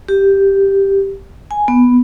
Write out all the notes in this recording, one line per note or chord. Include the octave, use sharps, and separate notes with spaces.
G4
G#5
B3